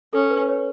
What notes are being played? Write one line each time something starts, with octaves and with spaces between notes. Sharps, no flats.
C#4 A4
B4
C#5